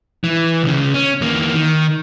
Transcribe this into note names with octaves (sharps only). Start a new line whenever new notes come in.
E3
C#2 C#3
C#4
E2 A#3
D#3